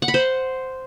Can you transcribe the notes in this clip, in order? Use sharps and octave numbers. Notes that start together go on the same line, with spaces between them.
F#5
B5
C5